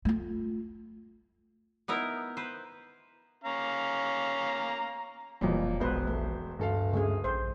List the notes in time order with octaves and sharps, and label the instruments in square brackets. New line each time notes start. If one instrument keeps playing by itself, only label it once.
[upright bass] A3 F4
[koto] B3 D#4 E4 A#4
B4 C5
[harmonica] C#4 F5 A#5
[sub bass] E1 [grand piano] F2 A#2 [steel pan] E3 F#3 G3
[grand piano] E1 C5 [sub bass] A#1 [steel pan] B3 B4
[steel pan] A3
[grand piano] D1 A4 F5 [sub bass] G2
[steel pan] C#3 A3 G#4
[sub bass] A#1 [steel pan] C5